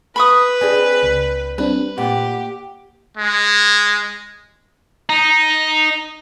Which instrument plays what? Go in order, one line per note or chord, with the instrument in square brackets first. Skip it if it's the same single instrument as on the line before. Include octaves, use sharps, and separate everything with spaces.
[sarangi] B4 [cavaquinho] B5 C#6 D#6
[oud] C4 D4 G#4 [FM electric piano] G#5
[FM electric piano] C#2
[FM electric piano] G3 C4 D4 [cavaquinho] B4
[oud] A#2 [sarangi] G4 [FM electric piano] F#5
[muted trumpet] G#3
[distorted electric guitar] D#4